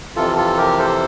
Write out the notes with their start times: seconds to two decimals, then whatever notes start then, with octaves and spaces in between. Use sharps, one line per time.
0.16 F2 C3 E3 F4 A4
0.36 F4 A4
0.57 G4 A#4
0.79 A4 C5